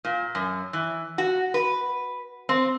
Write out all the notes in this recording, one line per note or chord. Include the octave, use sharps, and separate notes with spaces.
A#2
F#2
E3
F#4
B4
C4